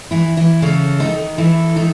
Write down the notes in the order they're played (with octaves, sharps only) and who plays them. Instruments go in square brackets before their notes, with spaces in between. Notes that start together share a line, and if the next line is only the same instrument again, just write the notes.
[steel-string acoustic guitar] E3 E4
E3 E4
[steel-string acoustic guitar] C#3 C#4 [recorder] A4
[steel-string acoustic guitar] D#3 D#4
[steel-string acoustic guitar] E3 E4 [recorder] A4
[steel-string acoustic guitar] D#3 D#4